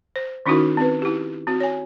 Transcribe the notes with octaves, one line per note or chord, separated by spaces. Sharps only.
C5
D#3 C#4 D#4 E4 F#4 A#4
C4 B4
E4 G4
C4 F#4
C#5 G#5